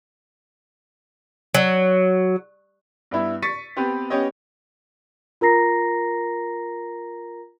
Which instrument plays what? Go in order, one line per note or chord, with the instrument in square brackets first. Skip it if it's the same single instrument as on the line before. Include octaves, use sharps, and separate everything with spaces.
[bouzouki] F#3
[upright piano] G2 B3 E4 E5
C#6 A6 B6 C#7 D#7
B3 C4 G4 B4
B3 C#4 G4 C#5 D#5
[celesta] F4 A#4 A#5 A#6 C7